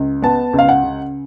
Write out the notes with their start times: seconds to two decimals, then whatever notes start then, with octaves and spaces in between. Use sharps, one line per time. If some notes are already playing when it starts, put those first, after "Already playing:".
Already playing: C#2
0.22 B3 A5
0.53 C#2
0.59 F5
0.69 F#5
0.84 C#3